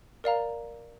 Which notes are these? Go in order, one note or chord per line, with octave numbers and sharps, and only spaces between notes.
A#4 D5 F5 A#5